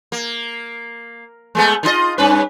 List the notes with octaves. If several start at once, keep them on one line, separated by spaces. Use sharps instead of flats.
A#3
G#3 A3 B3
D#3 F4 D#5
G2 C#4 B4